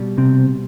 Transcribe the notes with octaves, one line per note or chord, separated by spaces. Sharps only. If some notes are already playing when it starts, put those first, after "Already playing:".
Already playing: B2 G3
C3 C4